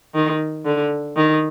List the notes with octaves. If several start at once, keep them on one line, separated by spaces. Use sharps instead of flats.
D#3
D3
D#3